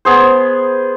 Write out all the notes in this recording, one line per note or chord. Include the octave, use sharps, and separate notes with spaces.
B3 G#4 C5